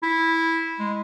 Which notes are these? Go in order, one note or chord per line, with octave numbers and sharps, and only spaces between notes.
E4
G#3